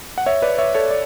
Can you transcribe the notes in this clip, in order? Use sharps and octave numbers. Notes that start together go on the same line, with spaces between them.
F#5
C#5 E5
B4 D5
C#5 E5
A4 C#5
D5